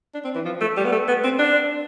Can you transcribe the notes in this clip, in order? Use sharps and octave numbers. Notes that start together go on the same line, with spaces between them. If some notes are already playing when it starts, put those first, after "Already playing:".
D4
C4
E3
F3
A3
G3
B3
A3
B3
C4
D4